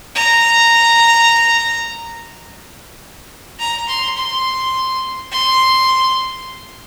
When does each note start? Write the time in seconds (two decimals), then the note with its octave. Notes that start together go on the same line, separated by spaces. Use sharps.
0.15 A#5
3.59 A#5
3.88 C6
4.17 C6
5.32 C6